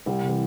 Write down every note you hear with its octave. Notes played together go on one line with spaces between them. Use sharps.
C2 G4
C3 E3